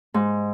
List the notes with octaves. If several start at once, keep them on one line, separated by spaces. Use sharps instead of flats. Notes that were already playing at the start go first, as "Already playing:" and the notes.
G#2